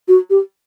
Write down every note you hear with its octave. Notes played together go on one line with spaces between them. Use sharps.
F#4
G4